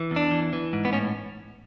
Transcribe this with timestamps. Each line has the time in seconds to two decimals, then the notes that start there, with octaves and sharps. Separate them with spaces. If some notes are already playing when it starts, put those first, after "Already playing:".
Already playing: E3
0.11 E2
0.16 D4
0.31 E3
0.53 E3
0.73 G#2
0.85 B3
0.93 A2 C#4